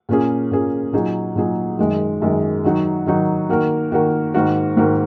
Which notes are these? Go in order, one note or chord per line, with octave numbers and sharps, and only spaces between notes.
A#2 A#3 C#4 G#4
A#2 A#3 C#4 G#4
A#2 F#3 D#4 G#4
A#2 F#3 D#4 G#4
F#2 D#3 G#3
F#2 D#3 G#3
D#3 F#3 D#4 F#4
D#3 F#3 D#4 F#4
D#3 A#3 F#4 A#4
D#3 A#3 F#4 A#4
G#2 D#3 A#3 F#4 A#4
G#2 D#3 A#3 F#4 A#4